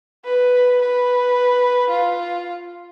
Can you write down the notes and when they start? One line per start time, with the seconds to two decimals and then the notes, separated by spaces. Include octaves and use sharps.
0.25 B4
0.81 B4
1.90 F4